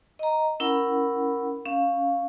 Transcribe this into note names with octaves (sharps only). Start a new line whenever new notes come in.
D#5 A#5
C#4 E4 A#4 F#5 B5
C#4 F5